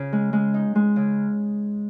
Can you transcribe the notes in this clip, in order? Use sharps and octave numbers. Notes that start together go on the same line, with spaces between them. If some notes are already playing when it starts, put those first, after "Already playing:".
Already playing: C#3
G#3
G#3
D#4
G#3
C#3